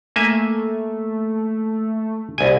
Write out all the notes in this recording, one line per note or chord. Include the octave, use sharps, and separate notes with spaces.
A3 A#3 E5 G#5
C2 B2 G#5